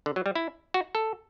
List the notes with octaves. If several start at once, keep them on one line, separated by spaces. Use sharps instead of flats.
D3
F#3
G3
E4
F#4
A4